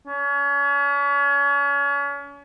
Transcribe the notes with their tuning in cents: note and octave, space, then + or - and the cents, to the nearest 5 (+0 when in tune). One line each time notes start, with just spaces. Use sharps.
C#4 +35